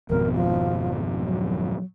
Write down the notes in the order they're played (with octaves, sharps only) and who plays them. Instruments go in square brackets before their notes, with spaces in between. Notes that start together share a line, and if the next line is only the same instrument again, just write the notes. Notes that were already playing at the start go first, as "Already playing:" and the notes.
[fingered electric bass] G#1 F2 B2 [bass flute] A#4
[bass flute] F3
F#3